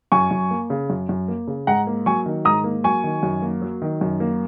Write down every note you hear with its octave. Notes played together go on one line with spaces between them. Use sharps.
F#2 G#5 C#6
F#2
A#3
C#3
F#2
F#2
A#3
C#3
G#2 F#5 A#5
A#3
F#3 G#5 C#6
D#3
G#2 A#5 D#6
A#3
F#3 G#5 C#6
D#3
F#2
A#3
F#3
D#3
F#2
A#3